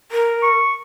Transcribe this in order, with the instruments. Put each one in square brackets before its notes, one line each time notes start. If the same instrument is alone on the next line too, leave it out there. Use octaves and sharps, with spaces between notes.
[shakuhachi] A#4
[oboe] C#6